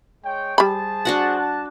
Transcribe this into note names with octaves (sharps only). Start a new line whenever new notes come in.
G#3 C#5 G5
G3 G#4 C5 A5 B5
D4 F#4 F#5
A5